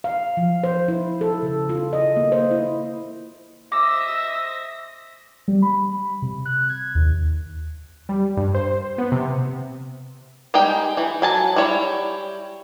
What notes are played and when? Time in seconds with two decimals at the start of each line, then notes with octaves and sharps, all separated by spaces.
0.04 F5
0.37 F3
0.64 C5
0.88 E4
1.21 A4
1.42 C#3
1.69 F4
1.93 D#5
2.16 A#3
2.32 C5
2.51 E4
3.72 C5 D#5 E5 D6 E6 A#6
5.48 G3
5.62 B5
6.22 C3
6.46 F#6
6.69 G#6
6.95 D#2
8.09 G3
8.37 G2
8.55 C5
8.98 B3
9.12 C3
10.54 G3 G#3 D#4 G5
10.97 E3
11.22 F#3 G#5 A5
11.56 G3 E4 C#5